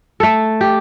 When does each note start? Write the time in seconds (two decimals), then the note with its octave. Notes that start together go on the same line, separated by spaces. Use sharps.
0.20 A3 A4
0.61 G4